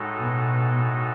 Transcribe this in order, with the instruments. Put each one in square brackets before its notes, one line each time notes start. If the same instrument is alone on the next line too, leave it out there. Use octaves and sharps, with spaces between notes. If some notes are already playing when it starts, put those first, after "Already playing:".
Already playing: [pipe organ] A2 G#3 D#4 F#4 A4
[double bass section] B2